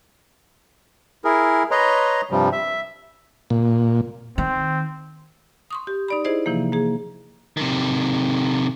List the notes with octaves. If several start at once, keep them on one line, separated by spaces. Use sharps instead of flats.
E4 G#4 A#4
B4 C#5 D#5 A#5 C6
G2 C3 F3 G3
E5
A#2
D#3 C4
C6 C#6 D#6
G4
D#4 D5 B5
E4 G#4 C5 D#5
C3 E3 F3 A#3
A#3 G#4
C3 D#3